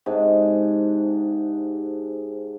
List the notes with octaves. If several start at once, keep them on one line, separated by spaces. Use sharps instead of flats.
G#2 C3 G#3 D4